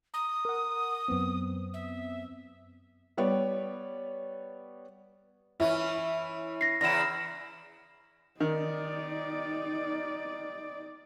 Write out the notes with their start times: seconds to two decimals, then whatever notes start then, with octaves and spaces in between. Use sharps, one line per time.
0.14 A#5 D#6
0.45 A#4 F#5
1.08 F#2 B3 C4
1.74 E5
3.17 G3 B3 C#5 D5
5.60 E3 C#4 E4
6.61 A#6 C7
6.81 E2 C#3 E4 A#6 E7
8.40 D#3 D#4 D5